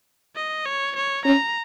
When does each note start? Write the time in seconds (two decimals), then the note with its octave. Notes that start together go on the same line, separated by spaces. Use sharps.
0.36 D#5
0.66 C#5
0.96 C#5
1.25 C#4 A#5